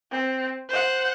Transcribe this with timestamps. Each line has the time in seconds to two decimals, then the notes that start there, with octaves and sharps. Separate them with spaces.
0.11 C4
0.69 C5 F#5